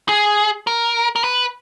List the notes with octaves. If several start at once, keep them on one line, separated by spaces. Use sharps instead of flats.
G#4
A#4
A#4
B4